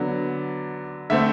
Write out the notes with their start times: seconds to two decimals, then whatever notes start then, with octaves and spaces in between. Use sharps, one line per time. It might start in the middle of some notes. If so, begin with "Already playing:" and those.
Already playing: D3 F#3 B3 D5
1.10 D3 A3 C4 E5